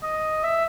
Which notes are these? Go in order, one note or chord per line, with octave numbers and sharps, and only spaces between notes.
D#5
E5